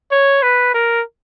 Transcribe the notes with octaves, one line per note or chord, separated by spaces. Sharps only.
C#5
B4
A#4